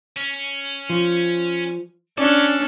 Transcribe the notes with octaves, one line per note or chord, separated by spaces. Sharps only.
C#4
F3
C#4 D4 A4 D5